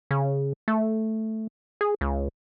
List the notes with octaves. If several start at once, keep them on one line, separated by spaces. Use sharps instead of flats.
C#3
A3
G#4
C#2